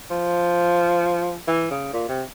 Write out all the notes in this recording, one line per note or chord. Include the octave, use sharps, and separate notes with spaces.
F3
E3
C#3
A#2
C3